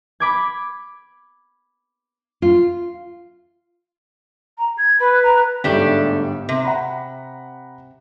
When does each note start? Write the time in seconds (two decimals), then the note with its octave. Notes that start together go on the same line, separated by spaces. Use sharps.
0.20 B5 D6 G#6
2.42 F4
4.58 A#5
4.78 G#6
5.00 B4 B5
5.23 A#5
5.64 G1 G#2 G3 A3 D4 G4
6.49 C3
6.64 F#5 A#5 B5